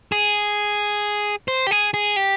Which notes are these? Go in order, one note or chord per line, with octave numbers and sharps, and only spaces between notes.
G#4
C5
G4
G#4
G#4
G4